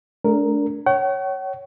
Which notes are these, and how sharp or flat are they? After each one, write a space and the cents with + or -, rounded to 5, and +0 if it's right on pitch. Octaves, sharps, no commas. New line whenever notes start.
A3 -40 D4 -25 A#4 +0
C#5 +0 F#5 +45